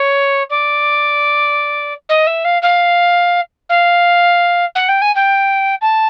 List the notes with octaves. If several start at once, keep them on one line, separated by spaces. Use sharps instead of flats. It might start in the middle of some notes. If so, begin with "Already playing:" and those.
Already playing: C#5
D5
D#5
E5
F5
F5
F5
F#5
G5
G#5
G5
A5